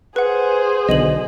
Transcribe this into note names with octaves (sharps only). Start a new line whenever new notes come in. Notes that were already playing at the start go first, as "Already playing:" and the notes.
G#4 B4 C5 F#5
B1 D3 D#5 D#7 F#7